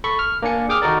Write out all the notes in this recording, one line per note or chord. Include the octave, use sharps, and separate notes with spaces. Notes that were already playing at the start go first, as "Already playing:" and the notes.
A4 B5 C#6
F6
A#3 D4 G#5 C#7
G#4 G5 D6 D#6 F6
D#3 D#4 F#4 A4 A#4 D5